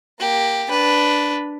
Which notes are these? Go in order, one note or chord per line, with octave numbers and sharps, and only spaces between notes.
A#3 G4
D4 B4